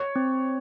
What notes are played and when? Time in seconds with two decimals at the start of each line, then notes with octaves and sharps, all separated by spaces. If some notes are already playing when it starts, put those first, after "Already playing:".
Already playing: C#5
0.16 C4